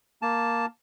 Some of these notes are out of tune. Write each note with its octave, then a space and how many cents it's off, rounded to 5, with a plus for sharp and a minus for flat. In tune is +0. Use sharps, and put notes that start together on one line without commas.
A#3 +0 A5 +0